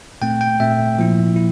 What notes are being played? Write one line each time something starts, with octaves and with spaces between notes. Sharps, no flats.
A#2 A3 C4 G5
G5
A#2 A3 C4 E5
A#2 F3 A#3 E4
E4